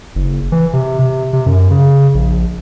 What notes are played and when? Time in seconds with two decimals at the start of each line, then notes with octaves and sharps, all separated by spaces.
0.15 F#1
0.52 E3
0.73 C3
0.99 C3
1.33 C3
1.46 F#2
1.71 C#3
2.15 A#1